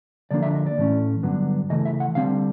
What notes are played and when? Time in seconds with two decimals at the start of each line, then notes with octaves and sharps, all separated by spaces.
0.31 D3 F3 A#3 D4 D5
0.43 E5
0.55 D#5
0.66 D5
0.78 A2 E3 A3 C#4
1.23 G2 D3 F#3 B3 D4
1.70 C#3 E3 A3 D#5
1.85 E5
2.00 F#5
2.15 D3 G3 C4 F5